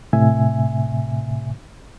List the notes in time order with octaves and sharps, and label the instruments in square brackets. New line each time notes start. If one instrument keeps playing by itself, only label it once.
[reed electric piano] A2 C3 E5 G#5